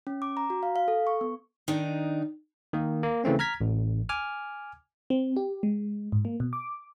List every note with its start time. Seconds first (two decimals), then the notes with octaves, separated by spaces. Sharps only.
0.07 C#4
0.22 D6
0.37 A#5
0.50 F#4
0.63 F5
0.76 F5
0.88 A4
1.07 C#6
1.21 B3
1.68 D#3 D4 D#4
2.73 D#3 A#3
3.03 A#3
3.24 C#3 E3 A3 C4 C#4
3.39 A#5 F6 G#6 B6
3.61 A1
4.09 G#5 D6 F6
5.10 C4
5.37 G4
5.63 G#3
6.12 G#2
6.25 A#3
6.40 B2
6.53 D6